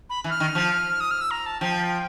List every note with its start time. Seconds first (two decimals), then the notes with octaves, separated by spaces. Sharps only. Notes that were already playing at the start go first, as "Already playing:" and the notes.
0.10 B5
0.24 E3
0.30 F6
0.40 D#3
0.55 F3
1.00 D#6
1.11 F6
1.21 E6
1.31 A#5
1.46 A5
1.61 F3 G5